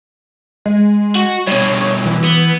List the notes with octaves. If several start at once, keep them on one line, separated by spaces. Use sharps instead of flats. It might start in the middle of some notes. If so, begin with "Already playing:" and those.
G#3
F#4
G2 B2 C#5
E3
B3